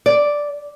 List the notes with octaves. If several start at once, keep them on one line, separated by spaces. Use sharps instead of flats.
D5